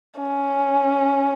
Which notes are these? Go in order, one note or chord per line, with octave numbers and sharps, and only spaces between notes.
C#4